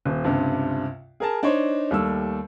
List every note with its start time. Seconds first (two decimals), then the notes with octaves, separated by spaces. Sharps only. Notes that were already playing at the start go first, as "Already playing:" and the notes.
0.05 D#1
0.24 C#2 G2 C3
1.20 G#4 A#4 A5
1.43 D4 D#4 C5 C#5
1.91 D#2 G3 A3 E6